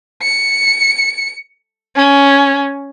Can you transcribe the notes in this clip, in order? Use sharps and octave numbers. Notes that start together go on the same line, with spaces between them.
C#7
C#4